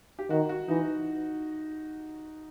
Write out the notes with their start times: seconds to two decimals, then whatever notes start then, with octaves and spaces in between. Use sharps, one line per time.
0.19 G4
0.30 D#3 F#4
0.49 F#4
0.68 E3 D#4